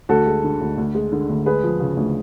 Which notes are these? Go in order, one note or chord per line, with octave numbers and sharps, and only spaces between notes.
D2 F#4 A4
G#3
D3
D2
D2
G#3
D3
D2
G#3 G#4 B4
F3
C#3
D2